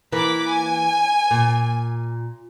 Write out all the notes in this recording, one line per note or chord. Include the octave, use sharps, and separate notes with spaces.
E3 A#3 B5 D6
G#5
A#2